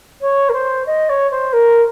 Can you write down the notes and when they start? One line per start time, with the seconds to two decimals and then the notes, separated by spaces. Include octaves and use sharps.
0.21 C#5
0.49 A#4
0.53 C5
0.86 D#5
1.09 C#5
1.31 C5
1.53 A#4